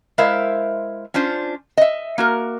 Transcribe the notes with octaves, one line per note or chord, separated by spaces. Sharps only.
G#3 E4 A#4 C5 E5 F5
C#4 D4 F4 C5
D#5 E5
A#3 F#4 A#4